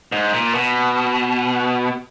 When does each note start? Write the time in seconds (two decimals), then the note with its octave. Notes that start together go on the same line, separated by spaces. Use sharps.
0.12 G#2
0.33 A#2
0.55 B2